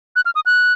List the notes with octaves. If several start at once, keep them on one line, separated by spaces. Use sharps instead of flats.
F#6
F6
D#6
F#6